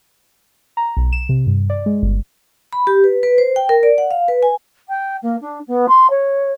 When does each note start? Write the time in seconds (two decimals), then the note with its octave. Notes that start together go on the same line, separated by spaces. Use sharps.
0.77 A#5
0.97 B1
1.13 E7
1.29 C3
1.47 G2
1.70 D5
1.86 G#3
2.02 G1
2.73 B5
2.87 G4
3.04 B4
3.23 B4
3.38 C5
3.56 G5
3.69 A#4
3.83 D5
3.98 F#5
4.11 F5
4.28 B4
4.43 G#5
4.88 G5
5.22 A#3
5.41 D4
5.67 B3
5.88 C6
6.09 C#5